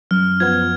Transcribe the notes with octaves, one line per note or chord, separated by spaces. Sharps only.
F#2 F6
F3 B3 G#6